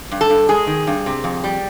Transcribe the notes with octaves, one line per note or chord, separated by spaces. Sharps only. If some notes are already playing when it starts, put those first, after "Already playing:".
G2
A4
G2
G#3 G#4
D#3
G2
C3
F2
G3